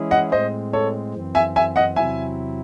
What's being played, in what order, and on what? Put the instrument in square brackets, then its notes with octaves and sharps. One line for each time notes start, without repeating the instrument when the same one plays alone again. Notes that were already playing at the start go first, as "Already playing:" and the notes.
Already playing: [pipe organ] E3 G#3 C#4 E4 G#4
[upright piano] D#5 F#5
[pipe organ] A2 G#3 C4 [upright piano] C5 D#5
[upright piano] A4 C#5
[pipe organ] F#2 E3 C4
[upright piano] E5 G#5
E5 G#5
D#5 F#5
[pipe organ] E2 C3 F#3 C4 E4 [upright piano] E5 G#5